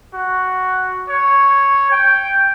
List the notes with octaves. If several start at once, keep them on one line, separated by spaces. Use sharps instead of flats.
F#4
C#5
G5